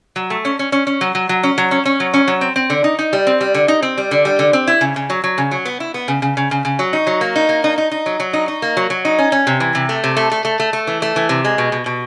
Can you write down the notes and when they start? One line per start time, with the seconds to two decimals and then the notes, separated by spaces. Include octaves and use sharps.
0.16 F#3
0.30 A3
0.45 C#4
0.59 C#4
0.72 C#4
0.87 C#4
1.01 F#3
1.15 F#3
1.29 F#3
1.43 C#4
1.58 F#3
1.71 C#4
1.86 C#4
2.00 F#3
2.14 C#4
2.28 F#3
2.41 C4
2.56 C4
2.70 D3
2.84 D#4
2.99 D#4
3.13 G3
3.27 C4
3.41 G3
3.55 D3
3.68 D#4
3.82 C4
3.98 G3
4.11 D3
4.25 G3
4.39 D3
4.53 C4
4.67 E4
4.81 C#3
4.96 C#3
5.10 F#3
5.24 F#3
5.38 C#3
5.51 F#3
5.65 B3
5.80 E4
5.94 B3
6.08 C#3
6.22 C#3
6.37 C#3
6.51 C#3
6.65 C#3
6.79 F#3
6.93 D#4
7.07 F#3
7.21 A#3
7.36 D#4
7.49 A#3
7.64 D#4
7.78 D#4
7.91 D#4
8.06 F#3
8.20 F#3
8.33 D#4
8.48 D#4
8.62 A#3
8.77 F#3
8.90 F#3
9.05 D#4
9.19 C#4
9.32 C#4
9.47 C3
9.60 E3
9.75 C3
9.89 A3
10.04 C3
10.17 A3
10.32 A3
10.45 A3
10.60 A3
10.73 A3
10.87 E3
11.02 A3
11.16 E3
11.29 C3
11.45 G#3
11.58 B2
11.72 B2
11.86 B2